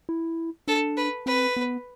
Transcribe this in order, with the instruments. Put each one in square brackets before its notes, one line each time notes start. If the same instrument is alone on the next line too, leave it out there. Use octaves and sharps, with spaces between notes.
[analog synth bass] E4
[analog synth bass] D4 [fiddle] A4
[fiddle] B4
[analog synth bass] C4 [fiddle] B4
[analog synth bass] B3